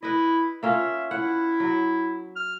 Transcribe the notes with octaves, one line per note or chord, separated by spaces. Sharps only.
E4 B4 D#5
A#3 C#4 F4 E5
E4 F#5
F#3
F6